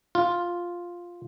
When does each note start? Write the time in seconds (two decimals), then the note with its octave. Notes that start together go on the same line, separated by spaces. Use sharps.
0.15 F4